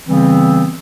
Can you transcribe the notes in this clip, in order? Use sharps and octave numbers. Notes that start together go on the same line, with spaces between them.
C#3 E3 G3 B3 C4